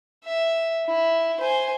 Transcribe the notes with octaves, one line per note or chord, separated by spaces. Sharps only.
E5
E4
C5 G#5